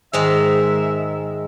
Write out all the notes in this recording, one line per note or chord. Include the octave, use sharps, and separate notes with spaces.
G#2 D#3 G#3 E5